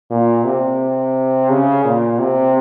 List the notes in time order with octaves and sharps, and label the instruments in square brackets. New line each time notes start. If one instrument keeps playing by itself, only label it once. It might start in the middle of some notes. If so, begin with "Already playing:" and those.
[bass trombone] A#2
C3
C#3
A#2
C3